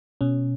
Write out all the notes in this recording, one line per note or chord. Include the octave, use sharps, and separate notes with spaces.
B2 C#4